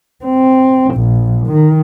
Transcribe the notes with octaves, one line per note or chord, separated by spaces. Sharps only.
C4
A#1
D#3